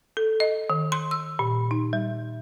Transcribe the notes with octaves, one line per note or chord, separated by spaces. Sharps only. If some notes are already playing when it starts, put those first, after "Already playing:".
A4
D#5
D#3
C6
E6
A#2
D#4
G3